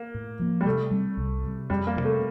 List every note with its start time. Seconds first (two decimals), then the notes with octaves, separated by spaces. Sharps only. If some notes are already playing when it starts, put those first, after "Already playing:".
Already playing: A#3
0.14 A2
0.39 F3 A#3
0.61 G3
0.66 C3 A3
0.91 G3 C4
1.17 C2
1.44 C3 G3
1.70 F2 G3
1.87 A#3
1.96 C3 F3
2.00 A3 C4